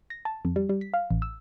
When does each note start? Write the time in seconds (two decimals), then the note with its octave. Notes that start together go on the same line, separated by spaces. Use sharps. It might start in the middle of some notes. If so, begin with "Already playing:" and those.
0.10 A#6
0.25 A5
0.45 F2
0.56 G3
0.69 G3
0.81 B6
0.94 F5
1.10 A1
1.22 E6